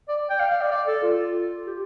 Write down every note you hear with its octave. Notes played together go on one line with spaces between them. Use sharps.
D5
G5
F5
F5
D5
D5
A4
F4
G4